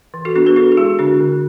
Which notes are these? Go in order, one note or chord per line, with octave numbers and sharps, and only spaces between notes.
E3
F#4 A4
B3 D4 F#4
G#4 B4
D4 F#4 A4
A4
G#3 E4 G#4
D3 D4 F#4
D3